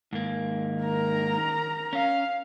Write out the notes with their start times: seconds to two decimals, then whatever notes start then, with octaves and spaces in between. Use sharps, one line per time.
0.13 G#2 D#3 A#3
0.83 A#4 A#5
1.93 C#4 F5